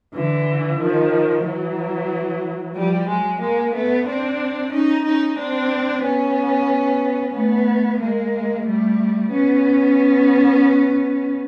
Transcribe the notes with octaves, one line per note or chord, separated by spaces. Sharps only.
D3 E3
D#3 F3
E3 F#3
F3 G3
F#3 G#3
G#3 A#3
A3 B3
C4 D4
C#4 D#4
C#4 D#4
C4 D4
B3 C#4
A3 B3
G#3 A#3
G3 A3
B3 C#4